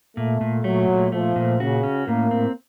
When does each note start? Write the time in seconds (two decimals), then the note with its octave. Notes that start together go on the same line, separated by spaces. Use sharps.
0.16 A#2 A3
0.41 A#2
0.64 F#3 A3
0.89 A#2
1.12 F3 A3
1.36 A#2
1.60 C#3 F#4
1.83 C#4
2.07 A2 A#3
2.31 C4